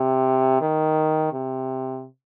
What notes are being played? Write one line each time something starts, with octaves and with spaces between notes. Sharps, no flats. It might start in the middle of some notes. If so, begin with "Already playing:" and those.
Already playing: C3
D#3
C3